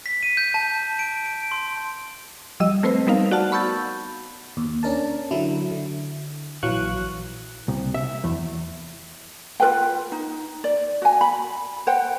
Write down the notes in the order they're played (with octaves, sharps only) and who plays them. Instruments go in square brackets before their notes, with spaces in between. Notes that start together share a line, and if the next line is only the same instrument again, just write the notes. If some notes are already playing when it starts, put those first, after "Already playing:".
[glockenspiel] B6
D#7
G6
A5
D7
D7
C6
[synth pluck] F3 G3 D#5 E6
A3 C4 B4 C5
G3 B3 D#4 A#4 F5
F#4 D5 F#5 A5 F6
B5 C#6 E6 G6 A6
[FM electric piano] D#2
C#4 D4 A#4 A5
D3 F#3 E4
D3
A#1 E3 F#3 F5 C#6 F#6
[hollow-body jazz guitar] C2
E5
E2
[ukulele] F4 A#4 B4 G5
D#4
D5
F#4 G#5
B5
C5 F#5 G5